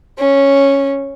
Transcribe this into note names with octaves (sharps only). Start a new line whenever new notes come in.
C#4